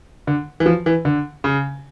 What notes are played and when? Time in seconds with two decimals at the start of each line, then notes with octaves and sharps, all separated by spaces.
0.27 D3
0.60 E3
0.66 F3
0.86 E3
1.05 D3
1.44 C#3